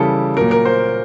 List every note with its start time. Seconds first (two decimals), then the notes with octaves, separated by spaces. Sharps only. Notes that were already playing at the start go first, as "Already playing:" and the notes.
Already playing: C#3 E3 G3 A4
0.37 A#2 F#3 A#4
0.51 A#4
0.65 C5